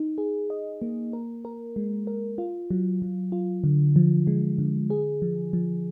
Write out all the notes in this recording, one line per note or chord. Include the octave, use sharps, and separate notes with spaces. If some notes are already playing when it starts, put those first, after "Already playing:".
Already playing: D#4
G#4
D#5
A#3
A#4
A#4
G#3
A#4
F4
F#3
F#3
F4
D3
F3
G#3
D3
G#4
F3
F3